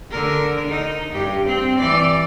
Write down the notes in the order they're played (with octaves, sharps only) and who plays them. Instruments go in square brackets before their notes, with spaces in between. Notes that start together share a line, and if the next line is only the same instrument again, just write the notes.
[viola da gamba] D3 A#4
D#4
G2 G4
C4
E3 D5